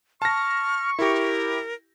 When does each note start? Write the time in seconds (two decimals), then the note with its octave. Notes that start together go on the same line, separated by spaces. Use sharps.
0.22 A5 C#6 F6 A#6
0.99 E4 G4 A#4